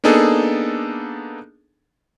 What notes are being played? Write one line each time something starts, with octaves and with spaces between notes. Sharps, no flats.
A#3 B3 D4 D#4 G#4 A4